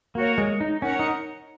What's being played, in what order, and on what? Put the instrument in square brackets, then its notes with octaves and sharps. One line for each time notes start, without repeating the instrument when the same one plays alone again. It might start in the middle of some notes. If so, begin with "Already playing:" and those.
[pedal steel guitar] A#3 [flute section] F#4 A#4 C#5
[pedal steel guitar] G#3
D#4
[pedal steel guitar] C#4 [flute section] A#4 C#5 F#5
[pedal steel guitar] D#4